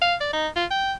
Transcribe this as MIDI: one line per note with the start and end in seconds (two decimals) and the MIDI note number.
0.01 0.15 77
0.21 0.33 74
0.33 0.47 63
0.56 0.65 65
0.71 0.93 79